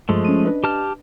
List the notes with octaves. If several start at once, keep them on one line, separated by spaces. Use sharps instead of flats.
G2 F3 G#3 A3
C#4 D#7
D4 B4 D#5
G4 A5 F6